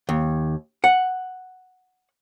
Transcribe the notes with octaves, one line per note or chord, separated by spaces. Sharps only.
D#2
F#5